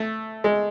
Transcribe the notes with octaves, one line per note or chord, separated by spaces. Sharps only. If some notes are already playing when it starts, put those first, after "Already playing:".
Already playing: A3
G#3